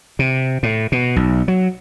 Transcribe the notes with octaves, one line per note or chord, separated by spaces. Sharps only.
C3
A2
B2
B1
F#3